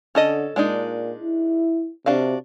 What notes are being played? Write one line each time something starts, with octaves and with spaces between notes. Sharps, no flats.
D3 C#4 A4 D#5
A#2 G#3 D4 D#4
E4
C3 D4 F#4 F5